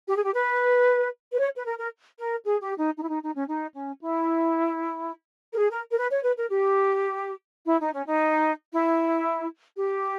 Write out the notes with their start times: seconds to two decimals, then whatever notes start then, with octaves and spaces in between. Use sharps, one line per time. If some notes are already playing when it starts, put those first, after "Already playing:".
0.08 G4
0.16 G#4
0.23 G4
0.34 B4
1.33 B4
1.39 C#5
1.57 B4
1.65 A#4
1.78 A#4
2.18 A#4
2.44 G#4
2.61 G4
2.79 D#4
2.96 D#4
3.03 E4
3.09 D#4
3.22 D#4
3.36 C#4
3.48 D#4
3.74 C#4
4.01 E4
5.52 A#4
5.58 G#4
5.71 A#4
5.91 A#4
5.97 B4
6.10 C#5
6.23 B4
6.36 A#4
6.49 G4
7.67 E4
7.81 D#4
7.93 C#4
8.07 D#4
8.72 E4
9.77 G4